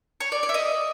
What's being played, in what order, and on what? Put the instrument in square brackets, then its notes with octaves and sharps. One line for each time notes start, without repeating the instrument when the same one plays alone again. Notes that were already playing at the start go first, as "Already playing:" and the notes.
[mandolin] C#5
D5
D5
E5
D#5